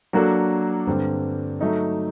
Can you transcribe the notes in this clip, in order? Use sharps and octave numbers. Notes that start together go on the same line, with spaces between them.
F#3 A#3 D4 F#4 A4
G2 D3 G3 C4
F#3 A3 D#4